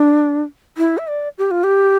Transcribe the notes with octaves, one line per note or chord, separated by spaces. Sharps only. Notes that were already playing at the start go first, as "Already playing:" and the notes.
Already playing: D4
E4
E5
D5
G4
F4
G4